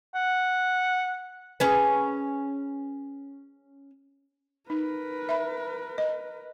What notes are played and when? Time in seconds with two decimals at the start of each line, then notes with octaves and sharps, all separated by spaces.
0.15 F#5
1.60 C#4 G#4 B4
4.70 D#4 A#4 B4
5.29 E5 B5
5.98 D#5